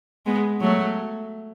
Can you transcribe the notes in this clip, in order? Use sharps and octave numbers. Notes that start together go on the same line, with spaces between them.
G#3 B3
F#3 A3